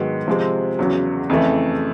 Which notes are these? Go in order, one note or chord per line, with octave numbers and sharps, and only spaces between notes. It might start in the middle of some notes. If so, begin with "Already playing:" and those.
Already playing: G#2 D#3 F#3 B3
C3 F3 G#3 C4
E2 C#3 F#3
F2 C#3 E3 A3